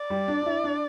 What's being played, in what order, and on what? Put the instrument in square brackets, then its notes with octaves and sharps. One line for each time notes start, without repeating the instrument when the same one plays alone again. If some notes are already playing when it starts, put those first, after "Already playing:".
Already playing: [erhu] D5
[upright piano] G3
D4
D4
E4
D4